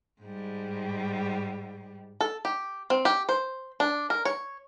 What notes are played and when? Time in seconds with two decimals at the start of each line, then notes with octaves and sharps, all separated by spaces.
0.22 G#2 G3
2.20 A4
2.45 G4
2.90 C4
3.05 G4
3.29 C5
3.80 D4
4.10 A#4
4.25 C#5